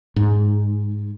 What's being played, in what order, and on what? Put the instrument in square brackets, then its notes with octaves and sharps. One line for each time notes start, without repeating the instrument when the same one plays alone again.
[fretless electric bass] G#2